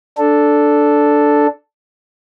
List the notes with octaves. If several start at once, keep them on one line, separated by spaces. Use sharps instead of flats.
D4 A4